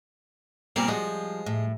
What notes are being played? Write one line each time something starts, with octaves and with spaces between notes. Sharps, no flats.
A#2 G3 A#3 C4
F3 G3 G#3 F#4
A2